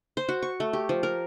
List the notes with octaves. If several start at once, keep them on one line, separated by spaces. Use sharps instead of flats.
C5
F#4
C#6
A3
G4
F3
A#4